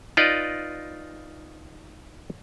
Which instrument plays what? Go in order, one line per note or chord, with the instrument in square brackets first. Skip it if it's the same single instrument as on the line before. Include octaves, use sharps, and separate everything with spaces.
[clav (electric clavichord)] D#4 F4 B4 D5 D#5